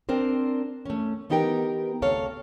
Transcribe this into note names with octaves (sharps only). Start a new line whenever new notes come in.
C4 D4 A#4 C5
A3 C#4
E3 B3 D#4 G4 A#4 G5
D2 C3 A4 C#5 F5